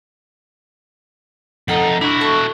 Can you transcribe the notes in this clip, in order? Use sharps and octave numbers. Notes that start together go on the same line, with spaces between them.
F2 D#4 A4 F#5
D4 E4 F#4
A4 A5 C#6